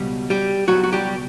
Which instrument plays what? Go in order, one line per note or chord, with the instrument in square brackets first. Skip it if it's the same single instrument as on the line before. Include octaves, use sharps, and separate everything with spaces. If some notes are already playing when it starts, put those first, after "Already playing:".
Already playing: [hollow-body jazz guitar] C#2 B2 G3
G3 G4
C#2 B2 F#3 G3 F#4
F#4
G3 G4